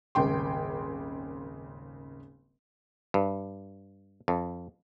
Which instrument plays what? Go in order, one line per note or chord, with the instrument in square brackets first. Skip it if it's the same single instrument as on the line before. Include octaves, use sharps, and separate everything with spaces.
[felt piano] D#1 G#1 C#3 G5 C6
[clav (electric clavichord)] G2
F2